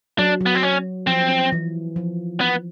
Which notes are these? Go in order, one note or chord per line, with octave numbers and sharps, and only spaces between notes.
F#3 D4
F#3
B3
C4
C#4
F3 C4
E3
F3
B3